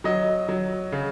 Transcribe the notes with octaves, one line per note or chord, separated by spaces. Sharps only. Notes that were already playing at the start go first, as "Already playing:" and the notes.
F#3 D#5
F#3
C#3